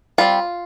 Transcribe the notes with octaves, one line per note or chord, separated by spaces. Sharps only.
G3 C4 F4